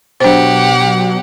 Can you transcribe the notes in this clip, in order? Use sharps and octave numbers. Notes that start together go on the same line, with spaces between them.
B2 F#3 D4 G4 C5 F#5